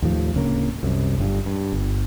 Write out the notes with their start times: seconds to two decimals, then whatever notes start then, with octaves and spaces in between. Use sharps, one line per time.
0.02 D#2 A2 F3
0.34 D1 C#3 A#3
0.83 C2 F#2
1.18 G1 G2
1.46 G2
1.72 G1